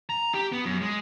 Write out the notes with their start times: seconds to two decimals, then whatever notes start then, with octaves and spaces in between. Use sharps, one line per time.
0.10 A#5
0.34 G4
0.52 B3
0.65 F#2
0.81 G#3